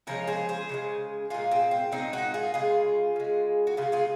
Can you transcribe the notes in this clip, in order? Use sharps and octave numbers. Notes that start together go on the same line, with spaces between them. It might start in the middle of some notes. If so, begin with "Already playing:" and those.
C#3 F3 G#3 A#4 C#5
G#4 C5
G#4 C5
C#3 F3 G#3
A#2 G#3 F4 G#4
C4
C4
A#2 G#3 C4 D#4
D#4 F#4
F4 G#4
C#3 G#3 F4 G#4
C#3 G#3
F#4
C#3 G#3 F4 G#4
F4 G#4